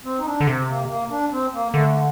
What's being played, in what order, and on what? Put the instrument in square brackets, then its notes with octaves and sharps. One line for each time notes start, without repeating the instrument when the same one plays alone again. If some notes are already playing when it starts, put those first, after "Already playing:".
[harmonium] C4
D#4
D4
[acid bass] D3
[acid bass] C3 [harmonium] C4
[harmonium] A#3
A#3
D4
C4
A#3
[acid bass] D3 [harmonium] A3